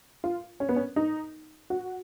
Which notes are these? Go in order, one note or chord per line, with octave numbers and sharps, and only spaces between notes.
F4
C#4
B3
C#4
D#4
F#4